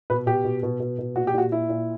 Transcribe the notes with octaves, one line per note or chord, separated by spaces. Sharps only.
B2 B4
B2 G4
B2
B2
B2
B2
A#2 F#4
G4
A#2 F#4
A#2 E4
A#2